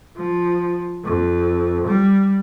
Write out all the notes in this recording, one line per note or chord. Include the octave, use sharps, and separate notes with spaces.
F3
F2
G3